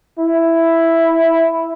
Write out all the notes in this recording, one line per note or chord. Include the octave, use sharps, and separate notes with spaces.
E4